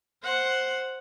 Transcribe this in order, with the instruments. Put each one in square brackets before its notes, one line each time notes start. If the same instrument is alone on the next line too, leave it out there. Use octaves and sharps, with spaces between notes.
[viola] C5 F#5